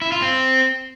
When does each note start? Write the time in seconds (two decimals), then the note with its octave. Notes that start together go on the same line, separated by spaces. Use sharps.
0.02 E4
0.12 F4
0.22 C4